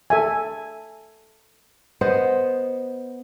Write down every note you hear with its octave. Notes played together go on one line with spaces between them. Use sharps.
A4 E5 G#5
B3 C5 D#5 F#5